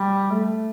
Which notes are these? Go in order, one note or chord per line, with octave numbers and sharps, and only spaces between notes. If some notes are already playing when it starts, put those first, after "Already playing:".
Already playing: G3
A3